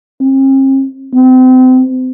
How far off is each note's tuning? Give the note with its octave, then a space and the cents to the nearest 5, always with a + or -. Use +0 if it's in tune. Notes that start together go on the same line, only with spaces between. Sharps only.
C4 +45
C4 -35